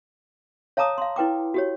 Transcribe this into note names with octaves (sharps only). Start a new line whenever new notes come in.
C#5 F5 A5 A#5 D6 D#6
F5 C6
E4 B4 G5 D6
F#4 G4 C#5